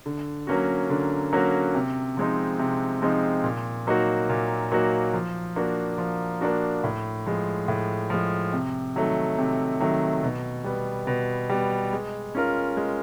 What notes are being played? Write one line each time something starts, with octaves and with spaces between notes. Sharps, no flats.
D3
F#3 A#3 C#4 F#4
D3
F#3 A#3 C#4 F#4
C3
F3 G#3 C4 D#4
C3
F3 G#3 C4 D#4
A#2
F#3 A#3 D#4 F#4
A#2
F#3 A#3 D#4 F#4
F3
A#3 D4 F#4
F3
A#3 D4 F#4
A2
F3 G#3
A2
F3 G#3
C3
D#3 F#3 A3
C3
D#3 F#3 A3
B2
G3 B3
B2
G3 B3
G#3
C#4 F4 A#4
G#3